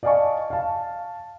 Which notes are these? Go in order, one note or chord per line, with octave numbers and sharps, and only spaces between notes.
D5 D#5 F5 G#5 A5 C#6
F5 A5